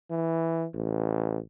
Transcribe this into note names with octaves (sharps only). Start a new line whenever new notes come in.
E3
A1